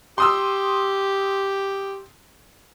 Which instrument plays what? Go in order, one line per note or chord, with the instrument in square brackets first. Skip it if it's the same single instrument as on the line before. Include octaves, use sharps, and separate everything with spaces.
[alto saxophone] G4 [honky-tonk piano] C6 D#6 E6